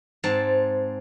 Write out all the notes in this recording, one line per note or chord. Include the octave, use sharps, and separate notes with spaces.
G#2 C4 A5